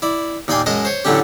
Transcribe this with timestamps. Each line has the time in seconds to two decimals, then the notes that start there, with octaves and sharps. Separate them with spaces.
0.02 E4 D5
0.48 D#2 A#2 D5 G5 G#5 C6
0.66 F#2 G#3 D#5 A5
0.85 C5 C#5
1.05 A2 D3 F#3 A3 C#4 G4